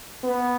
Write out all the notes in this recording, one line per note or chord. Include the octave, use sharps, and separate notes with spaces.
B3